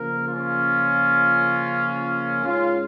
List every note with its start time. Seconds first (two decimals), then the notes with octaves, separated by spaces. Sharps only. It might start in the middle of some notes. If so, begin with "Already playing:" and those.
Already playing: C#3 F3 A#3 A#4
0.27 C#4 F4
2.45 G#2 G#3 C#4 F4